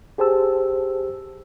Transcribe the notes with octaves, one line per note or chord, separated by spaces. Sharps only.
G4 G#4 C5 A5 E6